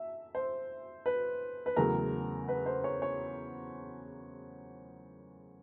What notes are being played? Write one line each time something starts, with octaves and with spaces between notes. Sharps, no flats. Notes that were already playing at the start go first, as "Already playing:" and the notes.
Already playing: E5
C5
B4
B4
E2 C#3 F#3 A3 A#4
B4
C5
C#5
C#5